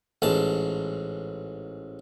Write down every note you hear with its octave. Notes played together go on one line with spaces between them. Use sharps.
A1 G#2 A5